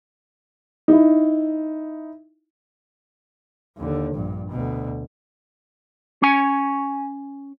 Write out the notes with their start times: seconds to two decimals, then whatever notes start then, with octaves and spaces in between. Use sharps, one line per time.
0.88 D#4 E4
3.77 D#2 D3
4.14 A#1 G2
4.50 D2 B2
6.22 C#4 G#5